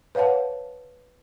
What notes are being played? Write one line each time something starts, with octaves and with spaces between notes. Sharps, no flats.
B4 C#5 F5 F#5 A5